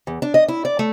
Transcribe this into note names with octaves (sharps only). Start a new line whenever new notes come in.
E2
D4
D#5
E4
D5
A3